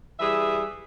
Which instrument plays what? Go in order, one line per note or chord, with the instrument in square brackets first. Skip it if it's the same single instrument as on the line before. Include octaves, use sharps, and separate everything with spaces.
[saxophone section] E3 G3 G#4 E5